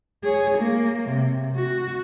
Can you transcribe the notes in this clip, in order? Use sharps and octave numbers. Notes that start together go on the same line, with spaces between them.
G#4 C#5
A#3
C3
F#4